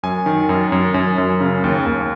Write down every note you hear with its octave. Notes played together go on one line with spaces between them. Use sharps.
F#2 G#5
D#3
F#2
F#2
F#2
F#2
C#3
D#2
D#2